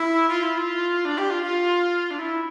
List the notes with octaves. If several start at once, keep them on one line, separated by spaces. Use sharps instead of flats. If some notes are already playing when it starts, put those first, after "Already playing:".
Already playing: E4
F4
E4
F4
D4
G4
F4
F4
D4
E4